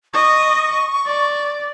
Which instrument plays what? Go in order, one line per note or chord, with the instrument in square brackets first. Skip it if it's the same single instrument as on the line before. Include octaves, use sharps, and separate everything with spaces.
[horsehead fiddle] D#5 [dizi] C#6
[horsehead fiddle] D5